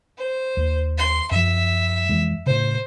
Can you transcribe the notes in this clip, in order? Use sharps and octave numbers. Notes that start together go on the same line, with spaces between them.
C5
D#2
C6
F#2 F3 E5
F2 E3 G#3
A2 C#3 C5